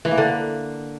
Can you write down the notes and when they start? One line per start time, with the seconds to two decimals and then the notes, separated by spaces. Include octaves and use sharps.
0.05 E3
0.11 A#3
0.18 D3